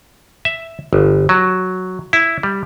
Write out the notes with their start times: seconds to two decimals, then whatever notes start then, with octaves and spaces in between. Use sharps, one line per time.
0.45 E5
0.93 G1
1.29 F#3
2.13 E4
2.43 G3